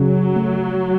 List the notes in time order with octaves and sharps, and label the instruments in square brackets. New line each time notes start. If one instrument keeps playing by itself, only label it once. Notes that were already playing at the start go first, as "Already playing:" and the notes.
Already playing: [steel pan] C#3 [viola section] F#3
[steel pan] A3